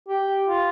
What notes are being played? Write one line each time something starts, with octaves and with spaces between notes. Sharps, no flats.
G4
F4